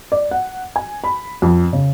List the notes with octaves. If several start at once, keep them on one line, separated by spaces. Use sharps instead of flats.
D5
F#5
G#5
B5
F2
C#3